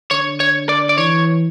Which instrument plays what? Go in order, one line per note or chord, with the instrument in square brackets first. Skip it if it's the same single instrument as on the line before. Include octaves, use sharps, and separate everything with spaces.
[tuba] D3 [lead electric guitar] C#5
[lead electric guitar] C#5
D5
D5
[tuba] E3 [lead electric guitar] C#5